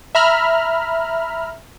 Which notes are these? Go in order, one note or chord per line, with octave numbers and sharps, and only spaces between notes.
E5 A#5 B5 F6